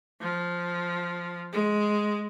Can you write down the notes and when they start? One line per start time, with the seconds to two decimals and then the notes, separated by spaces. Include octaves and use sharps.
0.21 F3
1.53 G#3